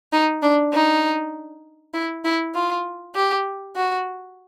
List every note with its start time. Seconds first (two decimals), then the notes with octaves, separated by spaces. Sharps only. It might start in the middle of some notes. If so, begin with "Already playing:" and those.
0.13 D#4
0.42 D4
0.73 D#4
1.94 E4
2.25 E4
2.55 F4
3.15 G4
3.76 F#4